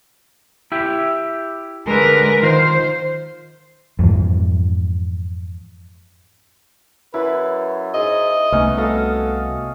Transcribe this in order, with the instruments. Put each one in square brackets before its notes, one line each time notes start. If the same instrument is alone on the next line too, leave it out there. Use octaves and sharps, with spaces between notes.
[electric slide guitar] E4 G4
[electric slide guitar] D3 G#3 [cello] A#4 B4
[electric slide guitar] D#3 F4 [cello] C5
[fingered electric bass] F2 G#2 E3
[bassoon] F#2 [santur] E4 [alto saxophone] B4
[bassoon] G#2 [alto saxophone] D#5
[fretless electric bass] C2 A3 [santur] B3 C#4 [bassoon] D#4
[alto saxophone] F#4 [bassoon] A4 [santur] D#5 F5